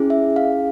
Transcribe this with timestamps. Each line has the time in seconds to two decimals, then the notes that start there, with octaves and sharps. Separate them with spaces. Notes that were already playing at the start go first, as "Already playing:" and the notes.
Already playing: C#4 E4 G#4
0.10 E5
0.36 F5